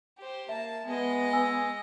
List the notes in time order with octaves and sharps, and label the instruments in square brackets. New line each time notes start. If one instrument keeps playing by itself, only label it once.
[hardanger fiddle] G4 C5
[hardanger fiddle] A#3 A5 [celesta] E5
[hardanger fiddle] G#3 D#5 [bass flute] B3
[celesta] G#5 E6